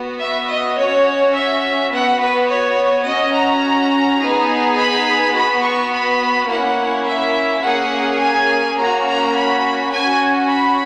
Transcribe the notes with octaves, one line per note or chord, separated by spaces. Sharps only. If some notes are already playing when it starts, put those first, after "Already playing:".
Already playing: B3 F#4
E5
D#5
C#4 F#4 C#5
E5
B3 F#4 F#5
B4
C#5
C#4 F#4 D#5
A#5
B3 D#4 G#4
B5
B3 F#4 B5
C#6
B5
A#3 C#4 E4 F#5
E5
A#3 C#4 G#4 F#5
G#5
A#3 C#4 F#4 A#5
A#5
B5
C#4 F#4 G#5
B5